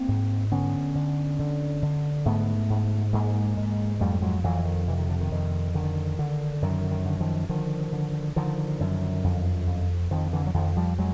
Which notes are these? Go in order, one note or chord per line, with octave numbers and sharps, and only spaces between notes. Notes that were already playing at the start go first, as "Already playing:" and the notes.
Already playing: A#3 C4
G#2
D3 B3 C#4
D3
D3
D3
G#2 A3 B3
G#2
G#2 G#3 A#3
G#2
F2 G3 A3
F#3 G#3
F2 E3 F#3
D#3
C3 E3
D#3
D3
D#3
F2
D3 D#3
D3
F#2 D#3
D#3
D3
D#3 F3
D3 D#3 F3
D3
D3 D#3 F3
F#2
F2
F2
F2 D#3 F3
D3 E3
F#3
F2 D#3 F3
F3 G3
F#3 G#3